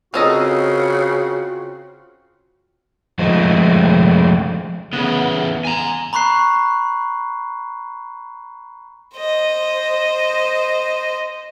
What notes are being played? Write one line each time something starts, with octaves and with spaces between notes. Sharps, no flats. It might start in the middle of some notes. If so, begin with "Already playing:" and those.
C#3 C4 C#4 F4 F#4 A4 A#4 D#5
F3 G#3 A3 G#4 C5 D#5
E2 C#3 B3
G#5 A#5
A#5 B5 C#6 F#6 C7
C5 D#5